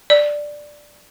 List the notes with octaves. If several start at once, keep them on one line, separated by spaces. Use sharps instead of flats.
D5